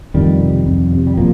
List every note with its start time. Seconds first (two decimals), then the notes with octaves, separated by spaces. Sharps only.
0.14 F2 D#3 G3
0.40 C3
0.66 F2
0.92 C3
1.07 G3
1.17 C3 F3 A#3